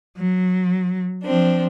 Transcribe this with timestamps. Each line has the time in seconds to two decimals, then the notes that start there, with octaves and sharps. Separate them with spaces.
0.17 F#3
1.23 F3 C4 D4